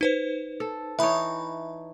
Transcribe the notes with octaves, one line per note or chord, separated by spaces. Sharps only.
D#4 B4 C5
A4
E3 D#4 C#5 E5 B5